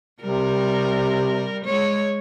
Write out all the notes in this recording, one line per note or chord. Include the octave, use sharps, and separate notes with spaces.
C3 G3 A#4
G#3 C#5